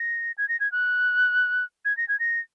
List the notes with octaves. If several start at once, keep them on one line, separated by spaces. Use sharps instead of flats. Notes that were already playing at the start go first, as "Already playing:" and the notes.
Already playing: A#6
G#6
A#6
G#6
F#6
G#6
A#6
G#6
A#6